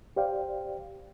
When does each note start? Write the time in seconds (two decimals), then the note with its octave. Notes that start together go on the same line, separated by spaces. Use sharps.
0.16 G4 C5 D5 F5 G5